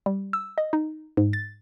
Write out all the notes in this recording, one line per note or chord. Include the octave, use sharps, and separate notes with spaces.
G3
E6
D#5
D#4
G#2
A6